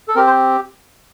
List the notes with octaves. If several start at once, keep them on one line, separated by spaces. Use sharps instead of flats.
A4
C4 G4 A#4
C5